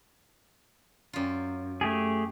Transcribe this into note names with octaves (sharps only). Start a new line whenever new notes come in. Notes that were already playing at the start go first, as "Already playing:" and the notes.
F#2 F4
A3 G4 G#4